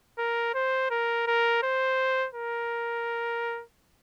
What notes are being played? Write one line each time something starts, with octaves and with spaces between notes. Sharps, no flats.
A#4
C5
A#4
A#4
C5
A#4